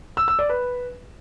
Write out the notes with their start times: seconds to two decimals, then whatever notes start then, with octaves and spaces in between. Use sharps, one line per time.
0.17 E6
0.28 E6
0.39 D5
0.49 B4